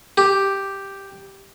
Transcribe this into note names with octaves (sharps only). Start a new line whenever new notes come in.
G4